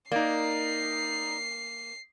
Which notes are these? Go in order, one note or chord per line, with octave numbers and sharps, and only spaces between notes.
A#3 D#4 D5 C7